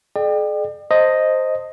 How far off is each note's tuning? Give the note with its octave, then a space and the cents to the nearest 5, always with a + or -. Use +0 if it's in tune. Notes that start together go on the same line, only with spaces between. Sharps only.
G#4 +45 D5 +40 G5 +0
C5 +0 D#5 +0 A5 +35